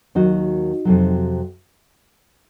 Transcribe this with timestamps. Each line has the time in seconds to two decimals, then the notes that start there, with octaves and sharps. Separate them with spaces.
0.15 D#2 D#3 F#3 D#4 F#4
0.85 F2 C3 F#3